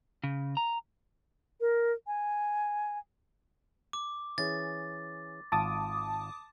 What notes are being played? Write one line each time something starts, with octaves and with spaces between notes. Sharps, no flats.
C#3
A#5
A#4
G#5
D6
E3 C#4 G#4 A6
G#1 F4 A5 D6 D#6